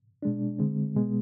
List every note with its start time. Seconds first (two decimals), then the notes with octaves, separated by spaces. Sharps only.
0.22 B2 G#3 D4
0.59 D3 G#3 C4
0.95 B2 G#3 B3